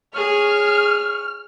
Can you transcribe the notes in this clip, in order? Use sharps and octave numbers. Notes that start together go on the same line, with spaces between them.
G#4 C#5 F6